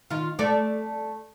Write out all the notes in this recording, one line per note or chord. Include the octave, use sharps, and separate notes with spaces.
D#3 F4
A3 D5